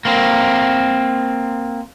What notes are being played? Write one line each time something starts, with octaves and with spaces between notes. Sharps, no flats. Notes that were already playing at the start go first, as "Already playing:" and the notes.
A#3 C4